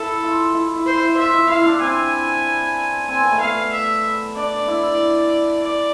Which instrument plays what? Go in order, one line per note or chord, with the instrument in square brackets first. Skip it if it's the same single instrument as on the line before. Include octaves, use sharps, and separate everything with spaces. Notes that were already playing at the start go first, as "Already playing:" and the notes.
Already playing: [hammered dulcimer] E4 [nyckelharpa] A4
[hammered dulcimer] F4
E4
E4
[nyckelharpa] C5
[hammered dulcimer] E4
[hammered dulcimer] F4 [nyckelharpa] E5
[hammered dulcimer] E4
[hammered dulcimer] E4 [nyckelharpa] F5
[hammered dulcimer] E4
D4
[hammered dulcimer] C4 [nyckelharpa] G#5
[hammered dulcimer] C4 [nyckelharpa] G#5
[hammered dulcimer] B3
A3
[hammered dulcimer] B3 [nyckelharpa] F5
[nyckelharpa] E5
[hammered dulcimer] D4 [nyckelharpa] D5
[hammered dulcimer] E4
[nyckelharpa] D5